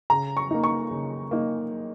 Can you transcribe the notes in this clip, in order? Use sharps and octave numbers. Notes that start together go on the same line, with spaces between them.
C#3 A#5
C#6
A#3 D#4
C#6
C#3
A#3 D#4